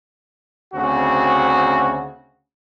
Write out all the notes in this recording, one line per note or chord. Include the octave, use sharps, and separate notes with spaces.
D2 C#3 C4 F#4